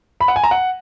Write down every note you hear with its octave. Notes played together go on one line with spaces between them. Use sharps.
B5
F#5
G#5
A#5
F#5